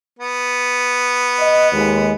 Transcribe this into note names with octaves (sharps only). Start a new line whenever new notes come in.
B3
D#5
D#2 G#3